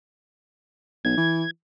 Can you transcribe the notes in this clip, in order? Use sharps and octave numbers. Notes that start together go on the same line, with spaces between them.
B1 G#6
E3